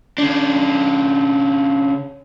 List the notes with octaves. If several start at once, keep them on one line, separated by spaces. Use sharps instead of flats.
C#3 D4